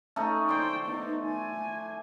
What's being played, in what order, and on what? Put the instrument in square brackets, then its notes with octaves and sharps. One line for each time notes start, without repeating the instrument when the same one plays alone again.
[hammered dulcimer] A3 C#4 D#4
[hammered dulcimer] C5 D5 [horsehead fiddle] G5
[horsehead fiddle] B3 D#4
G#5